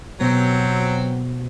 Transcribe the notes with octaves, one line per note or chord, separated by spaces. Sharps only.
B2 F#3 B3 C4 C5